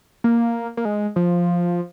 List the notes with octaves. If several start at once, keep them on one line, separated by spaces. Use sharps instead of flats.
A#3
A#3
G#3
F3